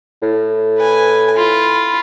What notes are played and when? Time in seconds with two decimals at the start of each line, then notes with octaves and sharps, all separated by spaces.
0.22 A2
0.78 B4 G#5
1.36 F4 B5